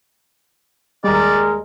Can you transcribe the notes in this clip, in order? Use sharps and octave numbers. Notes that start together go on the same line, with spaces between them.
D#2 G3 G#3 A#4 D5